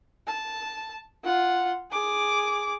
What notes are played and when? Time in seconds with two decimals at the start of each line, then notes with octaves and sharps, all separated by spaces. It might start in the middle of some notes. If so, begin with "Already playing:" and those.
0.27 A5
1.24 F4 F#5
1.91 G#4 D6